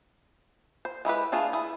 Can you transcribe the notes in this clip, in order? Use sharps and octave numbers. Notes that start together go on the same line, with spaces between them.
C5
G#3 E4 G4 B4
A3 D4 F4 G#4
E4 G#4